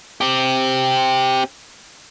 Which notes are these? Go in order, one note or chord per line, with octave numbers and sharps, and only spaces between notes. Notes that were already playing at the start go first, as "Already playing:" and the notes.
C4 G4